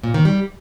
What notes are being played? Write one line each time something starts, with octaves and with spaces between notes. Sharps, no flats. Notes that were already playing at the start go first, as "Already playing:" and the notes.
A#2
D#3
G3